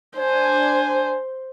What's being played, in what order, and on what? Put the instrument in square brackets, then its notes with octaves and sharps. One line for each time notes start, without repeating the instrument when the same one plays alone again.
[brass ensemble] D4 G#5 [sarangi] C5